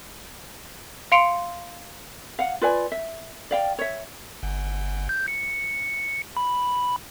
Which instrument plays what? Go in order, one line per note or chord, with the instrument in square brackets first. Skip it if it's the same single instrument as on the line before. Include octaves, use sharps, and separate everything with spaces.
[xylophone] F5 C6 C#7 D7 F7
[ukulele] F5 F#5
F4 B4 D5 G#5
E5
D5 F5 G5
C#5 E5
[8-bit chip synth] G1
G6
C#7
B5